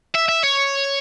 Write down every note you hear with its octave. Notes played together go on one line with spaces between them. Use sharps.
E5
E5
C#5